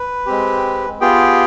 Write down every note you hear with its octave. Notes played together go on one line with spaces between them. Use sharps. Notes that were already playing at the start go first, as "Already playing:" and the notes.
Already playing: B4
G#3 C4 G4
B3 F4 G4 G#4 G5